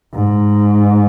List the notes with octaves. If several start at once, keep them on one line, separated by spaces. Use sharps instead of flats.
G#2